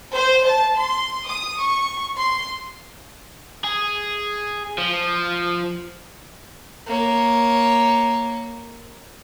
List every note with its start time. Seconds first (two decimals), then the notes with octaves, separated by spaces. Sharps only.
0.10 C5
0.47 A5
0.77 C6
1.24 D#6
1.58 C#6
2.15 C6
3.64 G#4
4.78 F3
6.87 A#3 C#5